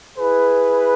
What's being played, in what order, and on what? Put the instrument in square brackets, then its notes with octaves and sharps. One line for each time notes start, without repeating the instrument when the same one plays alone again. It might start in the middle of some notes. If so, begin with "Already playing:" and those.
[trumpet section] E4 G#4 B4